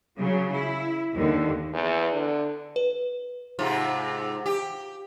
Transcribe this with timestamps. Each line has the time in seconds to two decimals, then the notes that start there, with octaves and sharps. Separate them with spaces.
0.20 C#3 F#3
0.53 E4
1.16 D#2 D3
1.73 E2
2.13 D3
2.76 B4
3.59 G#2 C3 F4
4.46 G4